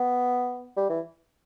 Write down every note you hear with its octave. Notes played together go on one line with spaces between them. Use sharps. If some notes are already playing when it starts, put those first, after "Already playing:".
Already playing: B3
G3
E3